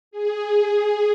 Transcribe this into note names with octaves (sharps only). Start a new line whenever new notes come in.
G#4